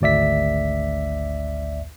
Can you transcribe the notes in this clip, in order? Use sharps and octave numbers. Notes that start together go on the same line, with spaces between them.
G#1 D2 D5 E5 B6